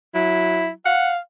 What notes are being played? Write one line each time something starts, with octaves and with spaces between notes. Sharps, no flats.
F#3 E4
F5 F#5